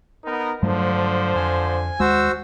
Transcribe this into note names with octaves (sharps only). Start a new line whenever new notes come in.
B3 D#4 A#4
G2 D3 F3 F#3 A3 C5
F2 G#5
D#2 G#3 F#4 C5 E6